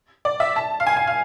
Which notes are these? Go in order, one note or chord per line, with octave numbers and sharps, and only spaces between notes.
D5
E5
A5
F5
G#5
G#5
F5